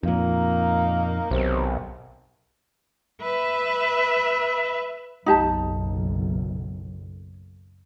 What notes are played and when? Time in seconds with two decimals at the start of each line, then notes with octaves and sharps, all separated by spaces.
0.03 F2 A#2 A#3 D#4
1.31 B1 C3 D#3
3.21 B4 E5
5.26 F#1 B1 D#4 G4 A5